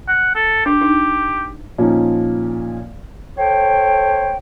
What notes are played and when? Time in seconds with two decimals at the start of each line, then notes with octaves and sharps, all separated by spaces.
0.08 F#5
0.35 A4
0.66 D4 G4
0.81 D4 D#4
1.78 A#2 F3 C#4 D#4
3.37 A4 C5 C#5 G5